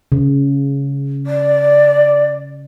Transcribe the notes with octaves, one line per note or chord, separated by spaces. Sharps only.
C#3
D5